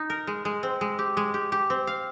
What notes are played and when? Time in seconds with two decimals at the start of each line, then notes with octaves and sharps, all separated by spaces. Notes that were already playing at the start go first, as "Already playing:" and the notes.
Already playing: D#4
0.10 A#4
0.27 G#3
0.45 G#3
0.63 C4
0.81 G#3
0.99 G4
1.17 G#3
1.34 G4
1.52 G4
1.70 C4
1.87 F5